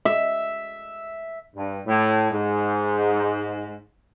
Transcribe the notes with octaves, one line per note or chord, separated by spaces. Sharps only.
E5
G2
A2
G#2